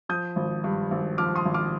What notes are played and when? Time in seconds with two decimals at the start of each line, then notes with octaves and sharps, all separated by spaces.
0.09 F3 D#6 G6
0.36 G#1
0.64 G2
0.91 G#1
1.18 F3 D6 F6
1.36 C6 D#6
1.45 G#1
1.54 D6 F6